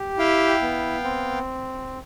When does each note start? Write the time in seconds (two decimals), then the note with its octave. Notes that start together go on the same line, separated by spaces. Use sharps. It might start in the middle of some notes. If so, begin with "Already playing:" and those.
Already playing: G4
0.18 E4 F5 G5
0.62 B3
1.04 C4